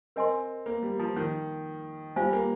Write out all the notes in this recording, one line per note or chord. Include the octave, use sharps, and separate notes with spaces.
C4 A#4 D#5 G#5 C6
A#3
G3
F3
D#3
G3 F4 C5 F5 G#5
A#3